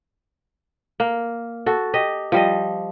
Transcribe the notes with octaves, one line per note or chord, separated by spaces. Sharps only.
A#3
F#4 A4
G4 D#5
F3 G3 D#5